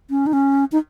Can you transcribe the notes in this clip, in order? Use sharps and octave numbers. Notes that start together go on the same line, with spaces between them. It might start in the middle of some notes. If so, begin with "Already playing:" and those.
C#4
D#4
C#4
D#4